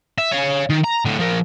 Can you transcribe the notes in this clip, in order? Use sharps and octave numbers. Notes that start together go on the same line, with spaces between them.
E5
C#5 F5
D#3
A#5
A2 D3
F3 A#4